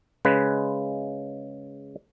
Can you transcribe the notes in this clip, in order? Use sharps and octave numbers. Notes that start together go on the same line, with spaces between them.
C#3 G#3 B4